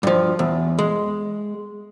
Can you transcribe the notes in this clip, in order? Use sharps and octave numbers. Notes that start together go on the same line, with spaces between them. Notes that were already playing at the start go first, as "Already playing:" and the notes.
G2 F3
E2
G#3